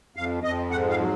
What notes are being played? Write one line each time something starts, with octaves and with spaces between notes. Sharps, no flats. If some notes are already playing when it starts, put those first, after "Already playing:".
F2 F5
F2 D#5
G#2 F#5
F5
F#3